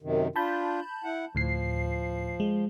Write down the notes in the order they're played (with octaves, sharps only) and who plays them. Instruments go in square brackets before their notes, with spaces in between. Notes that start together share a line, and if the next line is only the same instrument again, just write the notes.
[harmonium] F#2 C3 D#3
[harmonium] D4 F4 [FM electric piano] A5 B5 G6
[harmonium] E4 F#5
[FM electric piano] D2 A2 C7 [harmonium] F3
[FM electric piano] G#3